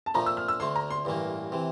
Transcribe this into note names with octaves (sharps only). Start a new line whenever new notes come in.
A5
A#2 F3 A3 A#5
E6
F6
E6
D2 D3 A3 C6
A#5
C6
A1 G2 E3 A#3
C3 E3